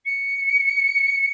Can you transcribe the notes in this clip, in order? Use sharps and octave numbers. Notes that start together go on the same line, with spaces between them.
C#7